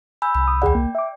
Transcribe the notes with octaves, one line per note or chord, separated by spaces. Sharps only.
G#5 B5 E6 G6
C2 B5
D#6
D#2 G#4 D5 F#5 G5
A#3
E5 D6